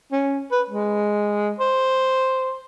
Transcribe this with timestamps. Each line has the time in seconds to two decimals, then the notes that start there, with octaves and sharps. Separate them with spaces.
0.12 C#4
0.52 B4
0.70 G#3
1.60 C5